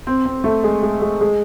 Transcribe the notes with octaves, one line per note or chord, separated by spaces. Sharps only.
C4
C4
A3
G#3
G#3
G#3
G#3